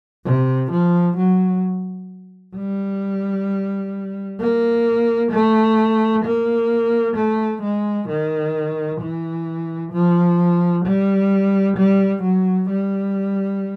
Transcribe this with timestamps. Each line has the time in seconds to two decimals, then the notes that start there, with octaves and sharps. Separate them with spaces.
0.25 C3
0.72 F3
1.18 F#3
2.56 G3
4.40 A#3
5.32 A3
6.25 A#3
7.17 A3
7.63 G#3
8.09 D#3
9.01 E3
9.92 F3
10.86 G3
11.77 G3
12.23 F#3
12.70 G3